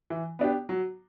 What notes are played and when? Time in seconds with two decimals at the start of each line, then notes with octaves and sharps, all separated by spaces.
0.10 E3
0.39 B3 D4 G4
0.69 F#3